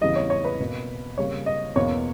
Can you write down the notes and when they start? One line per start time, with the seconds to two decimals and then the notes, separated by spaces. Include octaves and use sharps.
0.01 E2 C#3 E3 G3 D#5
0.16 C#5
0.30 C#5
0.45 B4
0.60 B2 A#3
1.18 C#3 G3 A#3 C#5
1.46 D#5
1.76 E2 B2 A#3 C#5